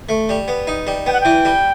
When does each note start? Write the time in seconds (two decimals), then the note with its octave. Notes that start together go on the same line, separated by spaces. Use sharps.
0.09 A3
0.29 G3
0.48 B3
0.67 D#4
0.87 G3
1.06 B3 G5
1.13 F#5
1.21 E3 G5
1.45 G3